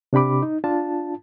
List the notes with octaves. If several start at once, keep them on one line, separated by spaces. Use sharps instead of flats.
C3 D4 G4 B5 D6
D#4
D4 F4 A5